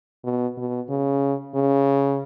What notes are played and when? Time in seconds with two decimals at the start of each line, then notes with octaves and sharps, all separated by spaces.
0.24 B2
0.57 B2
0.89 C#3
1.55 C#3